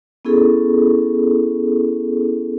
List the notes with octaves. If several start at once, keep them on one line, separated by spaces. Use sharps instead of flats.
B3 C#4 E4 G#4 A4